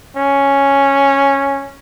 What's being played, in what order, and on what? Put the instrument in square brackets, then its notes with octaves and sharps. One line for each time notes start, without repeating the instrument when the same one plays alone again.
[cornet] C#4